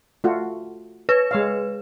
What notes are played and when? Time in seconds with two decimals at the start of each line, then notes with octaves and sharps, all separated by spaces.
0.24 A3 F4 F#4
1.09 B4 C#5
1.31 G#3 C#5 F5